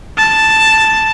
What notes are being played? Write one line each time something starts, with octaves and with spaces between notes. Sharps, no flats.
A5